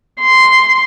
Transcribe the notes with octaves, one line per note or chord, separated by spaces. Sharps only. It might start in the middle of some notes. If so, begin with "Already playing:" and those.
C6